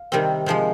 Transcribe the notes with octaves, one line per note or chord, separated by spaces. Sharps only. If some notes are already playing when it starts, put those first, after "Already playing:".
Already playing: F5
C3 D#3 G3 C4
C3 F3 G#3 C5